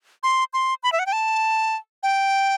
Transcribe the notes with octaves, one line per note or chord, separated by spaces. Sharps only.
C6
C6
B5
E5
F#5
G5
A5
G5